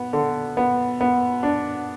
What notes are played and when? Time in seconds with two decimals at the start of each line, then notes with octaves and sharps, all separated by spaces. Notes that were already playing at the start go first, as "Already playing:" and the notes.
Already playing: B3
0.13 D3
0.57 B3
1.01 B3
1.43 D4